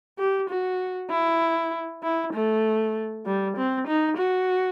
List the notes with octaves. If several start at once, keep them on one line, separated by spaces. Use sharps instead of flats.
G4
F#4
E4
E4
A3
G3
C4
D#4
F#4